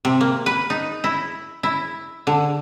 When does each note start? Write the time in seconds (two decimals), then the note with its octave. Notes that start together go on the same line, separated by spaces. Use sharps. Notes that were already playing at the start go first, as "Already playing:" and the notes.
0.05 C3
0.21 A#3
0.46 B4
0.70 D#4
1.04 E4
1.63 E4
2.27 D3